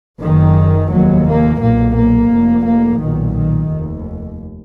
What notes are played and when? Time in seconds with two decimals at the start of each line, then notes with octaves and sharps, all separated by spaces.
0.21 F#1 F#2 D#3
0.90 F1 D#2 F#3
1.26 A#3
1.60 B1 A#2 A#3
1.95 A#3
2.30 F1 F2
2.64 A#3
2.99 B1 A#2 D#3
3.35 D#3
3.70 F1 D#2